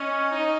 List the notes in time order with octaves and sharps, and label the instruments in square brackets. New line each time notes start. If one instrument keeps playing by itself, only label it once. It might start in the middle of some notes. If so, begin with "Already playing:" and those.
Already playing: [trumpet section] C#4 [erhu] D#5
[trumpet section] D#4